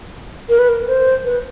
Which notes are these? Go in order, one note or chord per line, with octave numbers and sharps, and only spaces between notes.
A#4
B4
A#4
C5
B4